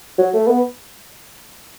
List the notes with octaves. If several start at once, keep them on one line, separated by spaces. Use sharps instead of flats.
F#3
A3
B3